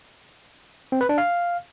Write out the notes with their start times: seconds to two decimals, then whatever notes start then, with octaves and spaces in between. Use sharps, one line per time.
0.92 C4
1.01 B4
1.09 D4
1.18 F5